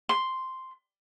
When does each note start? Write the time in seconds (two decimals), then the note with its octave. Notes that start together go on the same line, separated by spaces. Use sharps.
0.09 C6